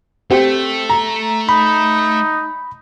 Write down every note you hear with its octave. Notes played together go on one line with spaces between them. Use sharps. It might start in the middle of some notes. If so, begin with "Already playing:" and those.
A3 C4 G4
A#5
D#4 B5